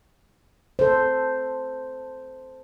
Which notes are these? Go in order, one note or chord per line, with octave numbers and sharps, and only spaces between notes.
A4 C5